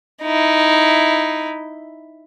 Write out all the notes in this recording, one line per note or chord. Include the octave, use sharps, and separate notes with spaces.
D#4 E4